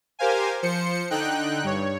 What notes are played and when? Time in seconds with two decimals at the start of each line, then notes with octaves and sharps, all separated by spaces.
0.19 G4 A#4 C5 F5 G#5
0.62 F3 C5 C#7
1.11 D3 D#4 G5 F#6
1.64 G2 C#5